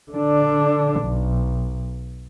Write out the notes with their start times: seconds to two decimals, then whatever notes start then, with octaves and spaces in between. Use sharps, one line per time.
0.12 D3 D4
1.01 B1